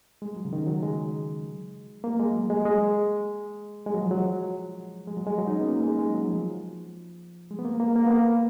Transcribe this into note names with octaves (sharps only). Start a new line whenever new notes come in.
G#3
F#3
C#3
D#3
F#3
G#3
A#3
G#3
F#3
G#3
G#3
G#3
F#3
F3
F#3
G#3
F#3
G#3
F#3
D#4
C#4
B3
A#3
G#3
G#3
F#3
F3
G#3
B3
A#3
A#3
A#3
B3
A#3